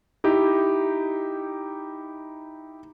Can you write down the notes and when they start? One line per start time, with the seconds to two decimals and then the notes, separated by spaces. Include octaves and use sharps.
0.24 D#4 E4 G4 G5